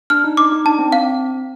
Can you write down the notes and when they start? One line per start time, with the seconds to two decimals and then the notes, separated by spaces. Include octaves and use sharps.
0.10 D4 F6
0.24 D#4
0.37 D#4 D6
0.52 D#4
0.65 D4 A5
0.79 C4
0.92 C4 F5